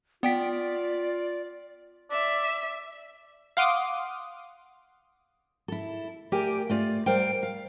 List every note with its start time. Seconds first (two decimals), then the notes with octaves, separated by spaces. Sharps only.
0.23 B3 F4 D5 G5 B6
2.11 D5 E5
3.57 F5 F#5 C6 D6 D#6
5.68 E4 A4
6.32 A3 G4 A#4 D5 G5 G#5
6.69 A3 F4 D5
7.06 G3 A#4 C5 F5 G5
7.43 F5